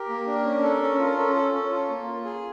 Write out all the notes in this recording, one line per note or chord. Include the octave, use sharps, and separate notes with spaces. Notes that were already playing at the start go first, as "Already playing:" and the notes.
Already playing: G4 A#4
A#3
D4
C#4
A4
C#4
F4
A#4
C#4 A4
A4
C#4
F4
A#3
F4
G#4